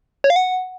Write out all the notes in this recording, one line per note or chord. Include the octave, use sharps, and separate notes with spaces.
C#5
F5
F#5